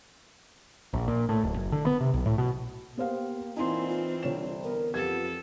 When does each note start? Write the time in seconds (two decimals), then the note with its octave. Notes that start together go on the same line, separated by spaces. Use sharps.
0.93 A#1
1.08 A#2
1.29 A2
1.43 D1
1.56 F#1
1.72 D3
1.86 B3
2.01 C3
2.14 B1
2.26 A2
2.38 B2
2.97 A#3 B3 G4 C5 F5
3.56 A#2 E3 C4 D#4 E4 F5 G#5 C6
3.89 F4
4.23 C2 D3 C#5 E7
4.64 B3 A#4
4.94 F2 B3 F4 G4 A4 G#6